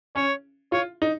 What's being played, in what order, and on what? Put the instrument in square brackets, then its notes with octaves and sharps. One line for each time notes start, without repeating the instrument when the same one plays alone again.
[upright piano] C#4 [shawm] C#5
[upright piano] F4 [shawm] C#5
[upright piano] D#4